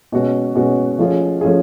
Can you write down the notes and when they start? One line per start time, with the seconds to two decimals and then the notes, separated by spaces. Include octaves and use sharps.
0.12 B2 G#3 C#4 F#4
0.55 B2 G#3 C#4 F#4
0.99 F3 A3 C#4 F4 G#4
1.41 F3 A3 C#4 F4 G#4